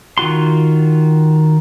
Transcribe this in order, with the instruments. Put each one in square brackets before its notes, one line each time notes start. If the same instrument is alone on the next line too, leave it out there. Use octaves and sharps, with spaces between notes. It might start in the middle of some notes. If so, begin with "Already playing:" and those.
[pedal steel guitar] D#3 F4 F#4 C6